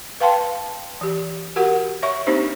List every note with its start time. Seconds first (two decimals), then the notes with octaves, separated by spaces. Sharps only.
0.20 B4 F5 G5 A5 C6
1.01 E3 G4
1.56 F#4 G4 A#4 F#5
2.03 C#5 E5 C#6
2.27 A#3 C4 D4 D#4 G4 C5